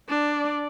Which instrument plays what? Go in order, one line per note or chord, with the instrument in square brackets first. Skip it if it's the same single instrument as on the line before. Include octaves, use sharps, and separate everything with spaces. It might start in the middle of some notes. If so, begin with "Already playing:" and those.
[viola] D4 [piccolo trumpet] D5